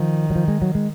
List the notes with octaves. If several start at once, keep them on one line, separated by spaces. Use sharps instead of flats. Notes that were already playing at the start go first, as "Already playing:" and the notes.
Already playing: D#3 F3
F#3
F3
G#3
F#3
G#3